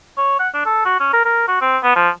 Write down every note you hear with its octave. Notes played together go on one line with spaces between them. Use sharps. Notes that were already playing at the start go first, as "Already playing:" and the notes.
C#5
F#5
D4
A4
F#4
C#4
A#4
A#4
F#4
C4
B3
F3